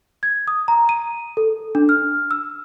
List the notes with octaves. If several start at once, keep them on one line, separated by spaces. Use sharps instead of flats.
G#6
D#6
A#5
D#7
A4
D4
F6
E6